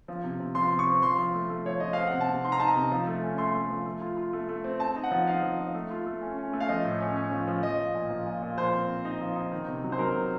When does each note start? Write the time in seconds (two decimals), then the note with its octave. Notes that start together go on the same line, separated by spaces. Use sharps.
0.08 F3
0.24 C3
0.40 C3
0.55 F3 C6
0.71 C3
0.79 C#6
0.87 C4
1.02 F3 C6
1.18 F3
1.34 A3
1.50 A3
1.65 F3 C#5
1.80 F3 D#5
1.93 C4 F5
2.07 F#5
2.12 C3
2.21 A5
2.28 C3
2.44 D#4 C6
2.52 A#5
2.60 D#4 A5
2.68 A#5
2.76 C3
2.92 F3
3.07 A3
3.23 C#4
3.38 A3 C6
3.54 A3
3.70 F3
3.86 A3
4.01 F4
4.17 F4
4.33 A3
4.49 A3
4.64 C4
4.80 C4 A5
4.96 D#4
5.04 F#5
5.11 F3
5.27 D#4 F5
5.43 F3
5.59 F3
5.74 A3
5.90 F4
6.06 A3
6.21 C#4
6.38 C#4
6.53 A3
6.60 F5
6.69 F3 D#5
6.84 A2
7.00 C#4
7.16 C#4
7.32 F3
7.48 F3
7.63 F3 D#5
7.79 F3
7.95 A#2
8.11 F3
8.26 A#2
8.42 A#2
8.58 F3 C5
8.73 C4
8.89 C4
9.05 D#4
9.21 F3
9.36 D#4
9.52 D#3
9.68 C3
9.84 F#3
9.92 C5
9.99 F#3 A#4
10.15 C3